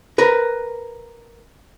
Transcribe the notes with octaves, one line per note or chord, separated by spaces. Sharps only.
A#4 B4